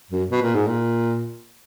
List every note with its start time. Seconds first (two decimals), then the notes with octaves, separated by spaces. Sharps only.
0.11 F#2
0.31 B2
0.42 A#2
0.54 G#2
0.67 A#2